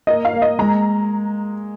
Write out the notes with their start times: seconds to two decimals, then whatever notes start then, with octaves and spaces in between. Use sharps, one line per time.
0.07 A#3 D#5
0.25 F5
0.33 A#3
0.42 D#5
0.59 G#3 A#5